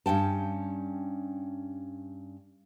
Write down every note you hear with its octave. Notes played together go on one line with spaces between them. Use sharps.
G2 C#4 G5 A5